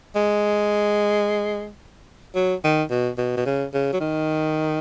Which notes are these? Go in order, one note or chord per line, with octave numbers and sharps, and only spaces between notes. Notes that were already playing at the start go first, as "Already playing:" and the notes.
G#3
F#3
D#3
B2
B2
B2
C#3
C#3
F#3
D#3